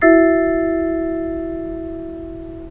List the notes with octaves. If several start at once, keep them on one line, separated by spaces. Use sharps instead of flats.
E4 F#4 E5 E6 A6 C7